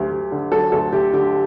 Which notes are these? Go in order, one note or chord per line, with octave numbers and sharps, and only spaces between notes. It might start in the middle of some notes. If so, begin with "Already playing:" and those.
Already playing: D2 F#3 G4
D2
D3
F#3 A4
D2 A4
D2 G4
D3 G4